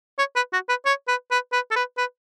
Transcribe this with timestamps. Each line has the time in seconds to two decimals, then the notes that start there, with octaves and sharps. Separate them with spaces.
0.19 C#5
0.36 B4
0.53 F#4
0.69 B4
0.86 C#5
1.08 B4
1.31 B4
1.53 B4
1.71 A4
1.76 B4
1.98 B4